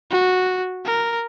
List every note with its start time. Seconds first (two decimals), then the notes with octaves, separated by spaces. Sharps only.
0.11 F#4
0.85 A#4